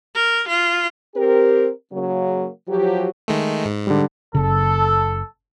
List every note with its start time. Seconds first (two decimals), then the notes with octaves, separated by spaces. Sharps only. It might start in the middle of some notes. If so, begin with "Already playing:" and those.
0.15 A#4
0.48 F4
1.16 C4 G4 A#4
1.92 C#3 F#3 A#3
2.68 F3 F#3 G4
3.28 D#3 G#3 A3
3.65 G#2
3.87 D3 G3
4.35 F#1 C#3 A4